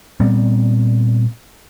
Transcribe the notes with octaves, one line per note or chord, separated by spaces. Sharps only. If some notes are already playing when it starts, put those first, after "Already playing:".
A#2 G3 B3 C4